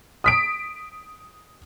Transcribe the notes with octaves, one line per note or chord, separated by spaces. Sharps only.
D#6 B6 D7